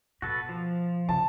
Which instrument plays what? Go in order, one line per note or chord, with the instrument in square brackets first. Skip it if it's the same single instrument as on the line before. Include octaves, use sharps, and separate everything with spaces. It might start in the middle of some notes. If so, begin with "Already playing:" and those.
[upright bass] B2 [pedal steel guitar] F#4 A4 B4
[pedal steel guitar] F3
[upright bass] C#3 [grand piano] A5